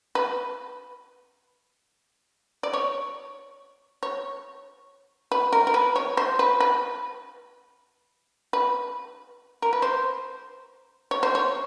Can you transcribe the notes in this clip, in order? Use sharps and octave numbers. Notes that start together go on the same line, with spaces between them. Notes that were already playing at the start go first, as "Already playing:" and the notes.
B4
D5
C#5
C#5
B4
A#4
A#4
B4
C#5
C5
B4
B4
B4
A#4
B4
C5
C#5
C5
C#5